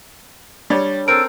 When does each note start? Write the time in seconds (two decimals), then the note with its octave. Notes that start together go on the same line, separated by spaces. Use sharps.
0.70 G3 D4 C#5
1.08 C4 A4 A#4 D7